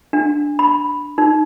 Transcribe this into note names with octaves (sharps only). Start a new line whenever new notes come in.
D4
B5
D#4